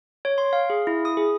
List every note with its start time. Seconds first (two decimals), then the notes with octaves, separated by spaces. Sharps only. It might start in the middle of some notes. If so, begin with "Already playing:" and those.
0.25 C#5
0.38 C6
0.53 F5
0.70 G#4
0.87 E4
1.05 D#6
1.17 G#4